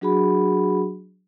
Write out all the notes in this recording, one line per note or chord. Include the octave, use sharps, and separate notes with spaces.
F#3 D4 F#4 G#4 F#5 B5